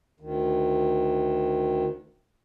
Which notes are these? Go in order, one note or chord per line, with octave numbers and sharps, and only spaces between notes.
D2 D#3